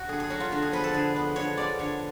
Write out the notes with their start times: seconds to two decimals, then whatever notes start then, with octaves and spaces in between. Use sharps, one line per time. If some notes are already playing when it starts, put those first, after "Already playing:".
Already playing: F#4
0.08 D3 G#4
0.20 G#4
0.30 F#3 C#4 F#4
0.40 F4
0.52 D3 F#4
0.62 G#4
0.72 F3 B3 B4
0.84 A4
0.93 D3 G#4
1.15 F3 B3
1.36 D3 C#5
1.57 G#3 C#4 D5
1.79 D3 C#5